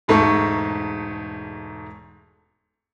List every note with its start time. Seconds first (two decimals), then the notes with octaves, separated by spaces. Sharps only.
0.08 E1 G#2 A3 A4 C#6